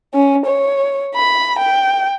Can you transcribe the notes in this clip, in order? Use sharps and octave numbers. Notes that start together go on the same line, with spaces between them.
C#4
C#5
B5
G5